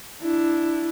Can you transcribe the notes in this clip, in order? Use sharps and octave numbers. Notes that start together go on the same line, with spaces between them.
D4 E4